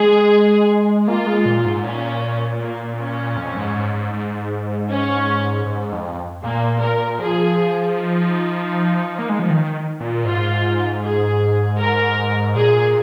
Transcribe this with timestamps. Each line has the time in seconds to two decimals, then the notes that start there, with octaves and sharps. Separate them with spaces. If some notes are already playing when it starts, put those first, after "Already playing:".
Already playing: G#3 G#4
1.07 A#3 F4
1.27 G#3
1.46 A#2
1.65 G#2
1.84 A#2 C#4
2.60 A#3
2.99 C#4
3.37 F2
3.56 G#2
3.75 G#2
3.94 G#2
4.13 G#2
4.89 C#4
5.66 G#2
5.93 F2
6.42 A#2 A#3
6.81 A#4
7.19 F3 G#4
7.96 D#4
9.19 A#3
9.29 G#3
9.39 F3
9.50 D#3
10.00 A#2
10.25 G#2 F4
11.02 G#4
11.79 A#4
12.55 A#2 G#4